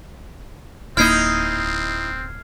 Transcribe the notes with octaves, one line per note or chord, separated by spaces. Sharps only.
D1 A#3 C4 D#4 E4 F6 G#6 C7